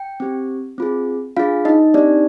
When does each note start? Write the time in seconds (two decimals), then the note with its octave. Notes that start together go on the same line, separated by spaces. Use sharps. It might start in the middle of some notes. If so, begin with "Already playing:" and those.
Already playing: G5
0.20 C4 G4
0.78 C4 F4 G#4
1.37 D4 F4 G#4 F5
1.65 D#4 D#5
1.94 C4 D4 D#4 G4 D5